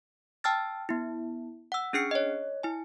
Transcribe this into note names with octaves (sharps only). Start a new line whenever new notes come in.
G5 A5 E6 F6 A6
B3 E4
F#5 E6
C#4 D4 G#4 F6 C7 C#7
C#5 D#5
E4 G#5